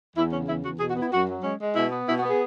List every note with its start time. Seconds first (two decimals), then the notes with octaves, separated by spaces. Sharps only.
0.16 E2 E4
0.32 C#3 C#4
0.48 E2 E4
0.64 E2 F#4
0.80 B2 G#4
0.90 F#4
0.95 B3
1.02 E4
1.11 F#2 F#4
1.28 F#3
1.43 G#3 C#4
1.60 G#3
1.75 B2 E4
1.91 B3
2.08 B2 E4
2.18 F#4
2.23 B3
2.29 G#4